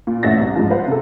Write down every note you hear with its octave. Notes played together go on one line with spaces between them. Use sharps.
A#2
A1 A2 E5 F#5 A6 A#6
C2
G#2 F3
B4 C5 F5 F#5
C3 A4